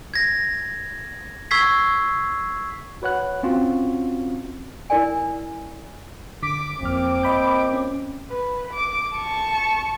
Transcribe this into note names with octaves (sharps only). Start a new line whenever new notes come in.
G#6 A#6
C#6 E6 G#6 B6 C7
F#4 B4 C#5 F#5 F#6
C4 C#4 F4 F#4
E4 A#4 D5 G#5
D3 D6 B6
G1 F2 A#2 C4 F6
D#5 B5 G6
C#4
B4
D6
A5 C#6